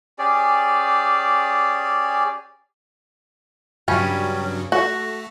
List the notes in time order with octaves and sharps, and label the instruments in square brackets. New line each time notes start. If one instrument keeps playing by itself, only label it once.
[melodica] C#4 G4 G#4 D5
[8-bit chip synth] G2 C#3 F#3 [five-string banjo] G3 C#4
[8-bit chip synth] A3 [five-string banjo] F#4